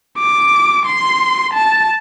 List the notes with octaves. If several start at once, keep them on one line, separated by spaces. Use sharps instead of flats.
D6
C6
A5